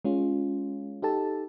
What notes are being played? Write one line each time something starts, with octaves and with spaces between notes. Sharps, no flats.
G#3 C#4 F4
D#4 G4 A4 A5